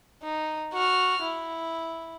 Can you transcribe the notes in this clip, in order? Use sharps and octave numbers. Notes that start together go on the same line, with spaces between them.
D#4
F#4 F6
E4